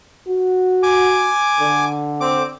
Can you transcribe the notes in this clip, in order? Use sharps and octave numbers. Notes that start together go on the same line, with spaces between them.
F#4
G#5 D6
D3
C4 D6